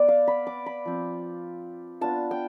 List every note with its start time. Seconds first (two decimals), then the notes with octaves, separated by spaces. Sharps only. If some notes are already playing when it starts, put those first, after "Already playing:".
Already playing: B3 D5
0.08 F5
0.27 B5
0.47 D6
0.66 B5
0.86 F3 C4 F4
2.01 B3 D4 F4 A5
2.31 G5